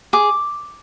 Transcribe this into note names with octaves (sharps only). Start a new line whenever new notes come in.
G#4 D6